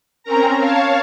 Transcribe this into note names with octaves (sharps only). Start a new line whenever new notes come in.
C4 C#4 A#4 A#5
C#5 F5 A5